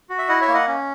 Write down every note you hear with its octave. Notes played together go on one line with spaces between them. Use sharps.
F#4
E5
E4 D#5 F#5
C#5 E5
A#3
D#5 F#5
C#4